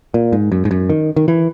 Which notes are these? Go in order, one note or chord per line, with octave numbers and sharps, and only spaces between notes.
A#2
G#2
F#2
G#2
F#2
D#3
D#3
E3